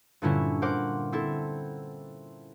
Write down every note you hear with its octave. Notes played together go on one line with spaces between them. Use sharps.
G2 A#2 D3 G3 C#4 E4
A#4 C5 F#5 D6
C4 E4 A4